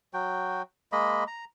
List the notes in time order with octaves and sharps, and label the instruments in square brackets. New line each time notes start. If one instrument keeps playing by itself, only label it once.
[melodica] F#3 F#4 G5
G#3 A#3 D#5 B5
A#5